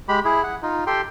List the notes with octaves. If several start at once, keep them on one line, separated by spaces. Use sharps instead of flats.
G#3 G4 B5
E4 G#4
F#5
D#4 F4
G4 A4 G5 C6